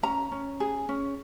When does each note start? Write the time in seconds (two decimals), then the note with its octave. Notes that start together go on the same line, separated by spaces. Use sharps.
0.03 C#4 A#5
0.32 C#4
0.60 G#4
0.89 C#4